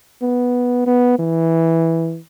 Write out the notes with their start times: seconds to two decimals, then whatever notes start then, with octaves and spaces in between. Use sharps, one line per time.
0.22 B3
0.86 B3
1.19 E3